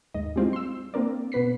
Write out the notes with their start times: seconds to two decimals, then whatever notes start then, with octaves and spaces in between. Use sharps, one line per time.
0.14 D#2 G#2 D#5
0.36 G3 G#3 C4 E4 F4
0.53 C6 E6
0.94 A#3 C4 D4 A#4 D5
1.32 B2 B3 B4 B6 C7